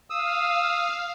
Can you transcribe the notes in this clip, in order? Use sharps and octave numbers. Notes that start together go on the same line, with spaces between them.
F5 D#6 E6